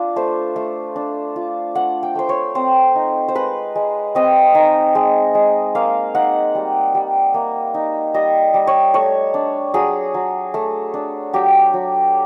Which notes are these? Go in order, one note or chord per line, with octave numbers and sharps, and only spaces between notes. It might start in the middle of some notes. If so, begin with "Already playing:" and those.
Already playing: D4 F4
A3 C5
A3
D4
F4
A3 F#5
G5
A3 C5
C#5
C4 C5
D#4
C5
G#3 B4
G#3
C4 D#5
D#4
G#3
G#3
A#3 F5
D#4 F#5
G3
G3
A#3
D#4
G3 D#5
G3
C#5
A3 C#5
D4
F#3 G#4
F#3
A3
D4
F#3 G4
F#3